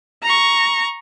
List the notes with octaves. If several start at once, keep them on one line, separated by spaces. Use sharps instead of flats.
A#5 C#6